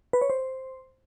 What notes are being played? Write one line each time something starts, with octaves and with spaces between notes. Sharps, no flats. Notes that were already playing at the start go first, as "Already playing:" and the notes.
B4
C#5
C5